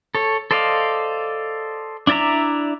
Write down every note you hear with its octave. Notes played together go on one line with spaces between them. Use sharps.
A4 C#5
A4 C5 D5 D#5 F5
D4 E4 D5 E5 A#5